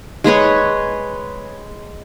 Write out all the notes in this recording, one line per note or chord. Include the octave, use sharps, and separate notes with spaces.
G#3 G#4 B4 C#5